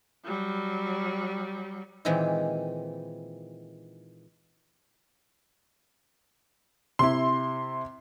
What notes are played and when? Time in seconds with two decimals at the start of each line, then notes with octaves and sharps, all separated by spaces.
0.24 F#3 G3
2.05 A#2 D#3 E3 G#3 C4 E4
6.99 C3 E4 C6